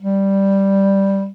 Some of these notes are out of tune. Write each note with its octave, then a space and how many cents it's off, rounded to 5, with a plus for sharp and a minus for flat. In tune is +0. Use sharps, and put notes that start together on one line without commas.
G3 +0